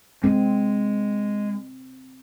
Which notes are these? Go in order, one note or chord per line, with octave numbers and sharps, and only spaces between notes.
G#3 C4